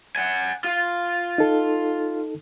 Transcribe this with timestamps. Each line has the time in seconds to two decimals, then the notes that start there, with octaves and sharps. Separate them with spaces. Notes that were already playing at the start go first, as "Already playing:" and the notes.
0.16 F#5 G#5
0.64 F4
1.38 D#4 A4